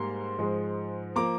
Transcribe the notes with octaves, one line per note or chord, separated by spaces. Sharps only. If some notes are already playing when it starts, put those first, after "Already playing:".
Already playing: G#2 G3 A#3 C6
G#2 F3 G#3
F3 A#3 A#5 D6